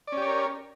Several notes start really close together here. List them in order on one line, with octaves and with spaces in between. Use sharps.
D5 C#4 G4 C#5 A#4